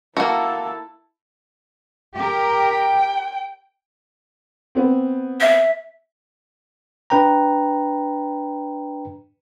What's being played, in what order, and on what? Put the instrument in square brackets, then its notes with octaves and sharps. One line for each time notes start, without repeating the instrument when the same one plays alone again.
[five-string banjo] A#3 F#4 [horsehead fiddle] E4 A4
[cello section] G4 A#4
[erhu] G5
[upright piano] B3 C4
[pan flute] E5
[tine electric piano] D4 B4 G5 A#5